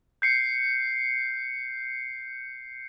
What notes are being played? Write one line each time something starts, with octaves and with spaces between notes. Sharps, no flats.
G6 C7 C#7